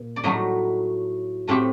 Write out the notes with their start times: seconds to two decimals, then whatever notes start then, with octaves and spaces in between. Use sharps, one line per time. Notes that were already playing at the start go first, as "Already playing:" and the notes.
Already playing: A#2
0.16 D5
0.24 A2 F#3 A3 D#4 D#5
1.47 A2 A3 C4 G4